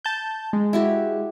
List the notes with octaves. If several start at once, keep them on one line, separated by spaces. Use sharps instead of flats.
A5 G6
G#3
E4 F#4 G4